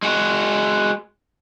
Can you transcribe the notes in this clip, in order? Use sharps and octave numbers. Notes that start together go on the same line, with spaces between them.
G#3 F#4